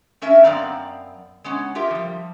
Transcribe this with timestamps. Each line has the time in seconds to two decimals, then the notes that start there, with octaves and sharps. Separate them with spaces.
0.22 A3 C#4 A#4 E5
0.44 F#2 B3 C4 D5 F5 A#5
1.44 G#3 B3 C#4
1.75 F4 G4 A#4 E5
1.91 F3 G3